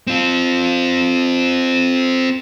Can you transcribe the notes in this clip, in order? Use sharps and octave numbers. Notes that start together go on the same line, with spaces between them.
C4 F4